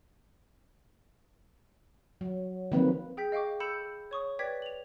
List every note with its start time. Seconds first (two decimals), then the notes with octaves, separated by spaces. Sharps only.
2.21 F#3
2.72 D#3 F3 F#3 A#3 C4 B4
3.17 G#4 G5 G6 B6
3.32 D#5 F5 G5 C#6 D6
3.60 A4 B5 E6 G6 C#7 E7
4.11 C#5 C#6 D#6
4.39 B4 D5 G5 D6 G#6 B6
4.62 F7 F#7